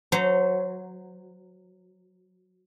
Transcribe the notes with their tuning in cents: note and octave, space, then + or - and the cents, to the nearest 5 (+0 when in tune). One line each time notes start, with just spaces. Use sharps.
F#3 -10 C5 -25 A#5 +0